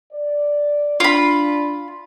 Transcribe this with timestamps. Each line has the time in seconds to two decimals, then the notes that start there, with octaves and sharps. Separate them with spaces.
0.12 D5
1.00 D4 F4 B5